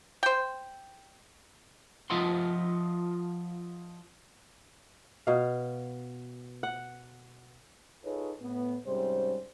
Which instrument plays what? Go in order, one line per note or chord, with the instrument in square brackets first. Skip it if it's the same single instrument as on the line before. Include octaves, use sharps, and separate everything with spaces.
[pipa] C5 G5
[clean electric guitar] F3 F4 D#5 E5 F#5 C6
[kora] B2 F5
F#5
[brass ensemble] D#4 F4 G#4 A4 B4 C#5
A2 B3
G#2 C3 G3 C#4 G#4 C5